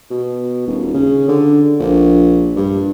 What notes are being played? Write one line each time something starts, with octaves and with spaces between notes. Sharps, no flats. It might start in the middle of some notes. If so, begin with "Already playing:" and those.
B2
D#1
C#3
D3
A#1
G2